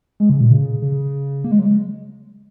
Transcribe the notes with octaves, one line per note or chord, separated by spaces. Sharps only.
G#3
C#3
A#2
C#3
C#3
A#3
G#3
F#3
G#3